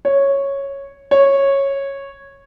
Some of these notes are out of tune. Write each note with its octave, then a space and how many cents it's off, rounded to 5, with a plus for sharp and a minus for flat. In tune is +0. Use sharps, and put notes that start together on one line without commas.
C#5 -5
C#5 -10